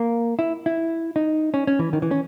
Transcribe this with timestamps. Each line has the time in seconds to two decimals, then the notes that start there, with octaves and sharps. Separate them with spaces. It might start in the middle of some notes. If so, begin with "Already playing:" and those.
Already playing: A#3
0.39 E4
0.66 E4
1.16 D#4
1.54 C#4
1.67 C#4
1.79 E3
1.93 D#3
2.02 E3
2.11 C#4